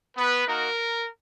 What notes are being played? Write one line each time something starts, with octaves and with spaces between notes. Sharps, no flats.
B3 B4
A#3 D#4 F#4 A#4